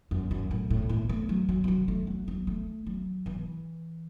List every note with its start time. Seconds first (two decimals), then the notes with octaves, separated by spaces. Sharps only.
0.11 F#2
0.31 F#2
0.51 A2
0.70 A2
0.89 A2
1.09 A3
1.29 F#3
1.49 F#3
1.64 E3
1.68 F#3
1.88 A3
2.07 F#3
2.28 F#3
2.47 A3
2.86 F#3
3.26 E3